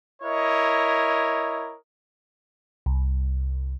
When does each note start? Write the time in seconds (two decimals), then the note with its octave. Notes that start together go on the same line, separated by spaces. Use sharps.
0.22 E4 A#4 C#5 D#5
2.86 C2